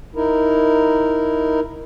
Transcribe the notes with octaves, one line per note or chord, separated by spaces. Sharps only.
D#4 E4 A#4